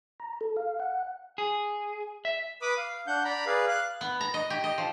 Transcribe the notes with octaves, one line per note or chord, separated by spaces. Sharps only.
A#5
A4
F5
F#5
G#4
E5
B4 B5 D6 D#6
F5
D4 F#5 G6
D5 A#5 B5
G#4 B4 D5 F5
F5 F#6
B3
A#5
D#5
G4
D#5
F3